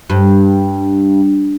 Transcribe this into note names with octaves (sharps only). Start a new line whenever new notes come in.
G2